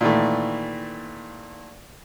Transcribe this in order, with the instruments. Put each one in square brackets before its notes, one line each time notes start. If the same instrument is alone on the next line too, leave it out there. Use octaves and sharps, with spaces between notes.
[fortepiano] A#2 D#3 E3 A3